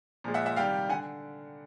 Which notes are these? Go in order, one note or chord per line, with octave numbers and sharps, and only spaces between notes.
A#2 F3 G#3
E5 F#5
E5 F#5
C3 D#3 G3 F5 G5
D3 F#5 G#5